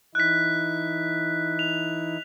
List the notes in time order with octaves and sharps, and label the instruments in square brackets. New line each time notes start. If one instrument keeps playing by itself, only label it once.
[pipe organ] E3 D#4 E4 [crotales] F#6 B6
[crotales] F7